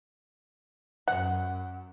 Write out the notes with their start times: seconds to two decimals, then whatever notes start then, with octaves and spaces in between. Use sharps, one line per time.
1.08 F#2 F#5